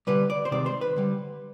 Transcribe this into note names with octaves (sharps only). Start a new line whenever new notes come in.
D3 G3 B4
D5
C5
C3 D#3 G#3 D5
C5
B4
D3 G3